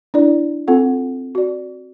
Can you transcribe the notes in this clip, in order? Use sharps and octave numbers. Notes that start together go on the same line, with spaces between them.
D4 E4 D5
C4 F4 A4 F#5
F#4 D5